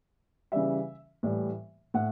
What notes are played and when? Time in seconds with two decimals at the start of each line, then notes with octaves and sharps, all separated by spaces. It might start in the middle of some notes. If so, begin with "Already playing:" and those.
0.52 C#3 E3 G3 E5
1.23 A2 E3 G3
1.94 A2 F#5